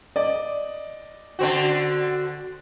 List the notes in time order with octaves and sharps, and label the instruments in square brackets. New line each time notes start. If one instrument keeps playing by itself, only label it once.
[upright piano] D5 D#5
[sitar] D3 C4 F#4